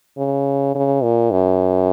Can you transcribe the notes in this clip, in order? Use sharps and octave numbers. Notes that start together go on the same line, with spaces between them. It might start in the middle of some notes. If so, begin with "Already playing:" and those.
C#3
C#3
A#2
F#2